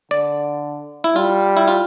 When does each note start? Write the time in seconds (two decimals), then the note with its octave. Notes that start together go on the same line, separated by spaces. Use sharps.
0.11 D3 D5
1.04 E4
1.16 G3 F4
1.57 E4
1.68 F4